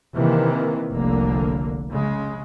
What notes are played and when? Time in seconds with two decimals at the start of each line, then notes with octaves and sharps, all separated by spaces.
0.15 C3 D#3 E3 A#3
0.92 F1 C2 D3 A#3
1.92 C#3 G#3